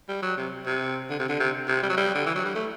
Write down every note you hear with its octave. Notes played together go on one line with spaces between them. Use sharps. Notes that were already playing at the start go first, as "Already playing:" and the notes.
G3
F#3
C3
C3
D3
C3
D3
C3
C3
G3
F#3
G3
D3
E3
F#3
G3
A3